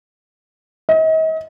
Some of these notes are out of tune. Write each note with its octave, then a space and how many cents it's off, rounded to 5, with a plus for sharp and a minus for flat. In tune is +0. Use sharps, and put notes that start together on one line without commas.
D#5 +40